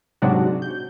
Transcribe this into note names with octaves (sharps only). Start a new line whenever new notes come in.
G#2 C3 F#3 D4 F#4
G6